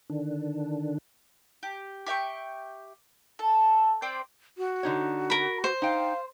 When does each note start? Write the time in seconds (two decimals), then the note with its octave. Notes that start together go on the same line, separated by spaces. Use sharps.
0.10 D3 D#3 D4
1.63 G4
2.06 G4 E5 G5 C#6
3.39 A4
4.02 C4 C5 D5 G5
4.58 F#4
4.83 D3 D#4 C#5
5.30 A#4 B5
5.64 C5
5.82 D#4 F5 G5